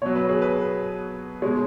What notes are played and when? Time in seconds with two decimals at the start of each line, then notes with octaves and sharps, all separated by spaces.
0.02 B2 F#3 C#5
0.15 B4
0.29 G#4
0.42 B4
1.42 B2 G#3 C#5